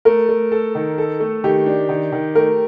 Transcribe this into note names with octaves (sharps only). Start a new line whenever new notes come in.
A3 A#4
A3
A4
D#3
A4
A3
D#3 G4
D4
D#3
D#3
A3 A#4